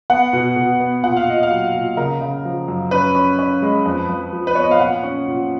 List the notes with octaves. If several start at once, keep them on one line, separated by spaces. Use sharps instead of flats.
B3 F#5
B2
B2
B3
A#2 F#5
F5
A#2 D#5
F5
F#3
A#2
C#3 A#4
C#3
F3
F#2
C#4 B4
C#4
C#4
G#3
F2
F2
F3
B4
B3 C#5
D#5
F5
A#2 F#5
C#4
A#2